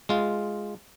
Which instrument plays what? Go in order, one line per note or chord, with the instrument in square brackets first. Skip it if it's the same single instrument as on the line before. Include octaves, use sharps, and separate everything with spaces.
[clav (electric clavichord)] G#3 F4